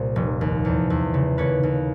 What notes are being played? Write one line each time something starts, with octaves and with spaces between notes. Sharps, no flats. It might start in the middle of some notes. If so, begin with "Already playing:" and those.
Already playing: C2 A#2
F1
D#2
E2
E2
C#3
D#2 B4 C#5
D#2